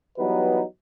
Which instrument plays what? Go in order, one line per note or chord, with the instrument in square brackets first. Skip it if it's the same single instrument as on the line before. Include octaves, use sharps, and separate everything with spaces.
[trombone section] E3 F#3 G3 B3 D#4 B4